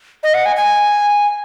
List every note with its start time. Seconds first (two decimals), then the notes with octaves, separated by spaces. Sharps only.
0.23 D#5
0.34 F#5
0.46 G#5
0.56 G#5